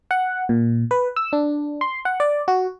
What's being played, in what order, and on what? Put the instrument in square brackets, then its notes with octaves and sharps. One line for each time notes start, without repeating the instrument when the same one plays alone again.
[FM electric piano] F#5
A#2
B4
E6
D4
C6
F#5
D5
F#4